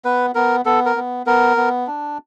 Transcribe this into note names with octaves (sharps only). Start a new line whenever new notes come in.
B3 B4
B3 A#4
B3 A4
A#4
B3
B3 A#4
B3
D4